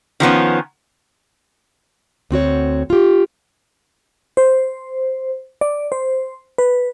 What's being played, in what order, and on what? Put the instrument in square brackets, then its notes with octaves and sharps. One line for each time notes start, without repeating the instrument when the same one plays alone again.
[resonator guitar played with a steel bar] D#3 F3 B3 C#4
[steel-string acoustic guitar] D2 C4 F#4 C#5
F4 G4
[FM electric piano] C5
D5
C5
B4